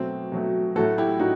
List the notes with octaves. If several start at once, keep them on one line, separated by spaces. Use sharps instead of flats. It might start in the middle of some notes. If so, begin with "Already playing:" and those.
Already playing: B2 F#3 A3 C4
B2 F#3 A3
A2 F#3 A3 F#4 A4
E4 G4
A2 D#4 F#4